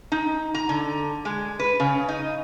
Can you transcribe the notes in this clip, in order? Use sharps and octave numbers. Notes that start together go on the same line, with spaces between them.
D#4
A#5
D3
G#3
B4
C#3
D#4